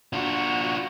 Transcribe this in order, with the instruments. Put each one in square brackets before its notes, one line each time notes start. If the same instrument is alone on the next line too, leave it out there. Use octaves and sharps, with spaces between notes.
[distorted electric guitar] D4 F4 [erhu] F#4